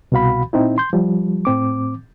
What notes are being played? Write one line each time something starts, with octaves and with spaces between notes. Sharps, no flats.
C2 B2 F#4 F5 B5
A#2 C4 D#4 E4
C6 G6
F3 G3
A2 C4 D6